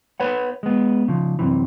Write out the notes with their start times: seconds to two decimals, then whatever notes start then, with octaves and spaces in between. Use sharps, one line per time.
0.20 B4 C#5 F#5
0.63 G#3 B3
1.08 C#3 F3
1.39 F#2 C3 E3